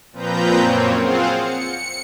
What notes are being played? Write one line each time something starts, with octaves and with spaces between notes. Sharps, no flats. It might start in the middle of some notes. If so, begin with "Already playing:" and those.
A#2 F3 C4 B4 A#5 G6
F#2 A#2 A#3 C4 C#5
C4 F4 G#4 C5 F5 F#5
C#7